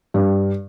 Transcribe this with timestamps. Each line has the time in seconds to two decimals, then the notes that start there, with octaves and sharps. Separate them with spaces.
0.14 G2